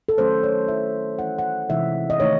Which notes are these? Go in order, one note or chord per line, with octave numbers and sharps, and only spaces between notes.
A4
D#3 F#3 A3 C#4 C5
C#5
F#3 C#4 E4 E5
E3 A3 C#4 E4 F#5
F#5
C3 E3 G#3 D#4 E5
D#5
D#3 A3 D#4 C#5